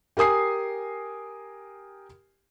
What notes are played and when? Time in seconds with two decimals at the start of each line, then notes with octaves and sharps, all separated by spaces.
0.17 G4 A#4 G#5 D#6 C7